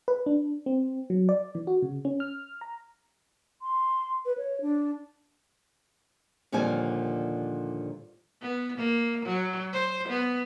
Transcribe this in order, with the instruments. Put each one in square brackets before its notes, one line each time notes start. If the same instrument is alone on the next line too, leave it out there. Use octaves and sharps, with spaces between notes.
[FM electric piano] B4
D4
C4
F#3
D5
E3
F#4
C#3
C#4
F6
A#5
[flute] C6
B4
C#5
D4
[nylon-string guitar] D#2 A#2 D3 F3 G3 G#5
[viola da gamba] B3
A#3
F#3
C5
B3